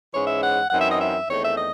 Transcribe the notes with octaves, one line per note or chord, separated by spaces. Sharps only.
G#2 E3 G#3 C#4 C#5
E5
F#5
F#2 E3 C4 D#4 F#5
E5
D#5
E5
E2 D#3 A3 C4 C#5
E5
D#5